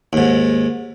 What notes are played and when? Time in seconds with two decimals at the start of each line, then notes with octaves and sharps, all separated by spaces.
0.13 D#2 G#2